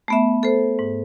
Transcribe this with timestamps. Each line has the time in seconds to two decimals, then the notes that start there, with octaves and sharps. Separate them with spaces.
0.08 A3 B3 E5
0.43 A4 C5
0.79 G#2